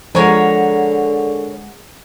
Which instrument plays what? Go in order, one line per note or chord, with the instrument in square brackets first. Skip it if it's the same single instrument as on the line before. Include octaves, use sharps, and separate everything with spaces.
[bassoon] D3 [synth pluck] F3 [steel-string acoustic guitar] G#3 G#4 F#5 [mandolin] A#4 C#5